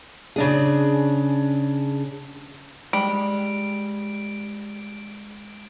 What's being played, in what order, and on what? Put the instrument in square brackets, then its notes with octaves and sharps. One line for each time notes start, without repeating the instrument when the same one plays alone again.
[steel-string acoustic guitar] C#3 D4 G#4
[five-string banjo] G3 [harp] G#3 [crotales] D7